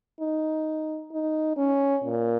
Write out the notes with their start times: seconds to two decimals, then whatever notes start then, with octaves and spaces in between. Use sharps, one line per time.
0.21 D#4
1.12 D#4
1.57 C#4
2.04 A#2